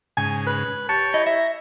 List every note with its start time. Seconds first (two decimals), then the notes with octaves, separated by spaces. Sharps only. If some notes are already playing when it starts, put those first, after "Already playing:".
0.17 G#2 C#3 G#5
0.47 B4
0.89 G4 C#5 A5 C#6
1.14 E4 D#5
1.26 E5 A#5